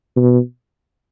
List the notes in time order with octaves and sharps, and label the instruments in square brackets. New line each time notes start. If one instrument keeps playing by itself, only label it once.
[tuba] B2